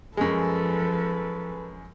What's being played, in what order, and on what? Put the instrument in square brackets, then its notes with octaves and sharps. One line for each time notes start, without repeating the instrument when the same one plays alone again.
[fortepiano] F#2 G#3 [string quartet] F3 [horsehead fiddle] A4 B4